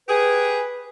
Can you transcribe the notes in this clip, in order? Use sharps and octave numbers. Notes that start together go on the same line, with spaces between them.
G4 G#4 B4